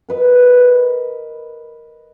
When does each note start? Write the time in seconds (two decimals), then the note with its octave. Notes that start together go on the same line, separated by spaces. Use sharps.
0.09 A#4 B4 D#5